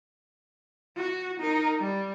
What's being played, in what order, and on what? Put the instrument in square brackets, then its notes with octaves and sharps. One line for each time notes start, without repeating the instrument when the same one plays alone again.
[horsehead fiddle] F#4
D#4 A#4
G3